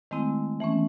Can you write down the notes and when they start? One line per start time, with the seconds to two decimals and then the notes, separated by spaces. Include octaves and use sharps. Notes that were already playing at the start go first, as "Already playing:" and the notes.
0.11 D#3 G#3 A3 C4 E4
0.60 E3 A3 B3 C#4